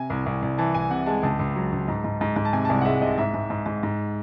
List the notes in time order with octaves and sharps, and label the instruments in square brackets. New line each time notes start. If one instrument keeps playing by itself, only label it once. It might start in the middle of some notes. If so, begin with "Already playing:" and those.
Already playing: [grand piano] C3 G#5
C2
C2
C2
E3 A5
C2 G#5
C3 F#5
G#3 A5
C#2 A5
C#2
F#3
C#2
G#2
G#2
G#2
G#2
A5
C3 G#5
A5
C2 G#5
F#5
G#3 E5
C3 D#5
G#2 E5
G#2
G#2
G#2
G#2